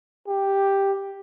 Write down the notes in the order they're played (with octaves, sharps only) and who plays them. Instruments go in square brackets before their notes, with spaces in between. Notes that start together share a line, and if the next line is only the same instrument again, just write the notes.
[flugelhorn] G4